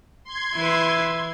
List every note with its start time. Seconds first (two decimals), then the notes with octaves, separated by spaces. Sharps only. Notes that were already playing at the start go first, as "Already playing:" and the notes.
0.24 C6 G#6
0.55 E3 E4 B4